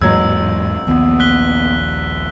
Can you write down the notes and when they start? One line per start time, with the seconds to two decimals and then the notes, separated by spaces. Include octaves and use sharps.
0.01 A1 E2 G#2 F#3 A#3 E6 G#6
0.87 A#1 D#2 A#2 B3
1.20 F#6 B6 G7